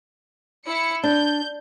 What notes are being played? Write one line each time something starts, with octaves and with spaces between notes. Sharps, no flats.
E4 C#7
D4 G6